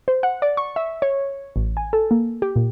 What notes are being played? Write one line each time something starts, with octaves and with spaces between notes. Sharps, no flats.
C5
F#5
D5
C#6
E5
C#5
A1
G#5
A4
A#3
G4
A#2